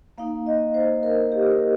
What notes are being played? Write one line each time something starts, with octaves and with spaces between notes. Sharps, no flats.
A#3 D#4 F5
D#5
C5
A#4
G4
A#4